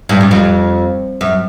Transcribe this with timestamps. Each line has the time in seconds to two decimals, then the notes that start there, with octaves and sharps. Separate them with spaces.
0.09 G2
0.21 F#2
0.31 F2
1.21 F#2